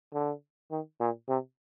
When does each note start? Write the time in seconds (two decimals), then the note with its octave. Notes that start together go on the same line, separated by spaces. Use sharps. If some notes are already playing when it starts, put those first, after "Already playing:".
0.14 D3
0.71 D#3
1.01 A#2
1.29 C3